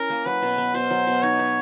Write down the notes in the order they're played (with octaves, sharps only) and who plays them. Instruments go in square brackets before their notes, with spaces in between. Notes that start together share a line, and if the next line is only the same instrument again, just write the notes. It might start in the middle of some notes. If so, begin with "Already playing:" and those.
Already playing: [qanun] C#4 E4 [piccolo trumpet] A#4
[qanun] A#3
[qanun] F#3 [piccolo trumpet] B4
[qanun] B2
B3
[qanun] B2 [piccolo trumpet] C5
[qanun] F#3
B2
[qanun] D#4 [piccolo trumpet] C#5
[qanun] B4